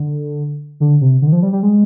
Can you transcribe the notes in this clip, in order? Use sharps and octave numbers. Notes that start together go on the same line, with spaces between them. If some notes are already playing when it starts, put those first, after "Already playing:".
Already playing: D3
D3
C3
D3
D#3
F3
G3
G3
G#3